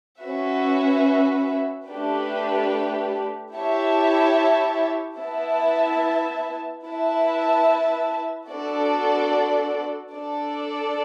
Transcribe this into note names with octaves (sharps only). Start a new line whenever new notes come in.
C#4 F#4 B4 E5
A3 D4 G4 B4
E4 G4 C#5 E5 A5
B3 E4 B4 E5 A5
E4 B4 E5 A5
B3 D4 F#4 A4 D5
D4 A4 D5